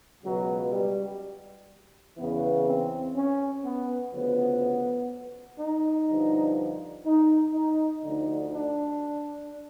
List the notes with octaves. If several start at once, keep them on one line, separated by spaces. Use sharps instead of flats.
C#2 B2 F#3
G3
E2 C#3 E3 B3
C4
C#4
B3
D2 C#3 F3 B3
D#4
G2 D3 F3
D#4
D#4
D2 D3 F3 D#4
D4